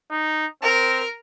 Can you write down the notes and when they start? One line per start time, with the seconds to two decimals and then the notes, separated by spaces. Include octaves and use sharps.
0.11 D#4
0.63 C4 A#4